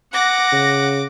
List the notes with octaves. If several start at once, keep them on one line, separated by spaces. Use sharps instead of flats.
F#5 D6 A#6
C#3